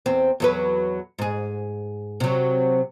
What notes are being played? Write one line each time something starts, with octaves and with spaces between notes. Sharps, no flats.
E2 C4
E2 F#3 B4
G#2 G#4
C3 F#3